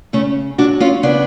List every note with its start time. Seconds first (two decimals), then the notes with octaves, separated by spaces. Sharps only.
0.13 C#3 A3 C#4
0.58 F#3 D4 F#4
0.80 C#4 F4
1.03 C#3 B3 D4